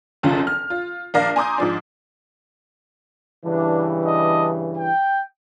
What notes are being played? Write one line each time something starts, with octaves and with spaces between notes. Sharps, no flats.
F1 C#2 F#2 F4
F6
F4
A#1 A#4 D5 F5 A#6
G#5 A#5 C6 D6 D#6 G6
G#2 F3 D4
G2 C#3 E3 D4
D4 D#5
G5